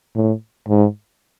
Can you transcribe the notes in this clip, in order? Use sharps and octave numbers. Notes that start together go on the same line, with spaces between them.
A2
G#2